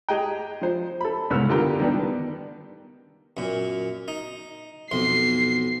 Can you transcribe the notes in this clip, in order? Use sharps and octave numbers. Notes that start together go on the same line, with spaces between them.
G4 G#4 D#5 G5
F3 C5
A4 B5
C2 G#2 C#3 B3 E6 F6
D3 F4 G4 A#4 G5
D#3 G3 B3 D4
F#2 A#2
D#4
B1 F2 C6 C7